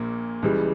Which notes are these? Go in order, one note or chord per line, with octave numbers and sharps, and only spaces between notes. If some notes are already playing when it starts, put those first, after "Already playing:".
Already playing: A#1 A#2 A#3
C#2 C#3 E3 G3